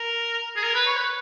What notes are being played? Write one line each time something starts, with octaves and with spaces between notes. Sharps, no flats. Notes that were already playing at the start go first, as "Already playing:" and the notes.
Already playing: A#4
G#4
A#4
B4
C#5
B4